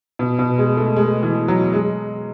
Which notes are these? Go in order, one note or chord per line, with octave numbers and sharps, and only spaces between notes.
B2
B2
G#3
A3
G#3
E3
F#3
G#3